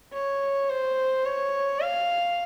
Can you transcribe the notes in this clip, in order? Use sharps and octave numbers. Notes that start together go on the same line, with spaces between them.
C#5
C5
C#5
F5